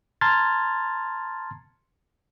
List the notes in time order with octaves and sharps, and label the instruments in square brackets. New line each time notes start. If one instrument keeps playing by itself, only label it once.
[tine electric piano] A5 A#5 C6 F6 G#6 A6